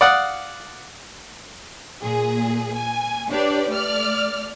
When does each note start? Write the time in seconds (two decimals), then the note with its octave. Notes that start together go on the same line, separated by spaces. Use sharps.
0.01 D5 F5 F#5 D#6
2.01 A#2 G#4
2.74 G#5
3.30 D4 G4 B4 C#5 D5
3.70 A3 D5 F6